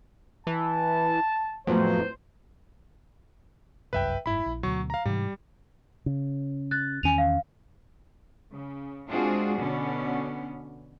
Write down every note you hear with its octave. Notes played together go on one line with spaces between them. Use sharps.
E3 A5
F2 A2 F#3 B3 C5
G1 C2 F#2 B4 E5 G5
F#1 G#2 E4 B5
A#1
D2 B2 F#3 C#6
F5 A#5
G#2 C3 E3 G3
C#3
F#6 A6
E2 D#3 C#4 G#5 D#7 F7
F5
C#3
G#3 C4 D4 F4 F#4 G#4
B2 D3 B3 C#4